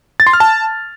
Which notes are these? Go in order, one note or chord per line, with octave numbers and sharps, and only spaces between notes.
A6
C6
F6
A5